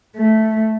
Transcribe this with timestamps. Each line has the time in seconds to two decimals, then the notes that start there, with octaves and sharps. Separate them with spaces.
0.16 A3